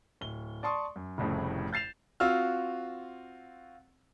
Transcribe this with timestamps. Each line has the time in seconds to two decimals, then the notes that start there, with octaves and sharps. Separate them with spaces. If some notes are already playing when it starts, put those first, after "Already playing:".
0.21 D1 G7
0.63 D5 A5 C6 C#6 D#6
0.96 F#2
1.18 F1 C2 F2 A2 C#3
1.73 G6 A6 C7 E7 F7
2.20 C4 F4 F#4 E6 F6